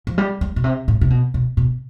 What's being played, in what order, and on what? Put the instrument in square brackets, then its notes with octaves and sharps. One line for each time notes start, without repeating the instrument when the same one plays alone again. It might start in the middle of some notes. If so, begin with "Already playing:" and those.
[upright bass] F3
G3
G3
B2
C3
A2
C3
B2
B2
B2